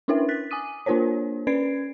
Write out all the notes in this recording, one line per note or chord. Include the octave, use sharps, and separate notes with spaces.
C#4 D4 E4 A#4 B4 E5
F#6 A6 B6
G#5 D6 D#6 D#7
A#3 D4 F4 A#4 C5 C#5
C#4 B4 D5 G#6 C7 D7